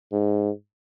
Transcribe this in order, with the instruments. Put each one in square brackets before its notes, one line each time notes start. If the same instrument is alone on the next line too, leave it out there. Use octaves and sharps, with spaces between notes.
[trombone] G#2